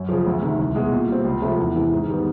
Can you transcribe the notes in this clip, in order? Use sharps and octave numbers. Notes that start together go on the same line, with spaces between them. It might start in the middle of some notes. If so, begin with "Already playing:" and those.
Already playing: F#2
C#3 F3
D2
C3 D#3
C2
B2 G#3
A#2
G3 C4
C#2
C3 F3 A3
E2
C3 E3
G#2
D#3 G3 B3